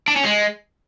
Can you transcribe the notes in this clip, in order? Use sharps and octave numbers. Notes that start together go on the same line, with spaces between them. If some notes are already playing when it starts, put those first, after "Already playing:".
D4
C#4
G#3